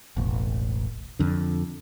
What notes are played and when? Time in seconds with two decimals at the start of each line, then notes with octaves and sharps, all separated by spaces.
0.17 E1 A1
1.19 F2 D3